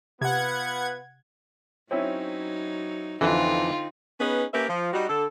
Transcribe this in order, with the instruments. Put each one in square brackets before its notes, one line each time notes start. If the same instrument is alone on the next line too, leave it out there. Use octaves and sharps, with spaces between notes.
[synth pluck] C3 [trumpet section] B3 F4 B4 [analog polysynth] F#5 G#6
[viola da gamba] F#3 D#4 [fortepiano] C4 C#4 E4
[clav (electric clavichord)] F2 E3 [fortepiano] D3 [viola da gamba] C4 D#4 [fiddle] F4
[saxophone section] B3 C#4 D#4 G#4 B4
A#3 C#4 G4 A#4 B4 E5
F3
G3 D#4 F#4
D3 A4